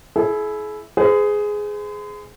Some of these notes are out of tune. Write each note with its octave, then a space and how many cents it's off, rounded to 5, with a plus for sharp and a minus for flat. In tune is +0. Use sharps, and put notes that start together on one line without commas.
E4 +0 G#4 +40
G#4 +5 C5 -45